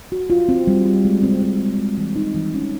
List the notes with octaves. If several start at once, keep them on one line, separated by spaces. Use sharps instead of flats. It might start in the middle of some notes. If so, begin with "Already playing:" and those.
F#4
F4
C4
G3
F4
G#3
C4
C4
G#3
G#3
E3
D#4
E3
C#4